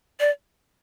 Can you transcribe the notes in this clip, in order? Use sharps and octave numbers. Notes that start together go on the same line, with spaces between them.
D5